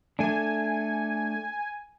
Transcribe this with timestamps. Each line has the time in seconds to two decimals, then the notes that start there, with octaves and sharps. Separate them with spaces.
0.19 A3 D4 G#5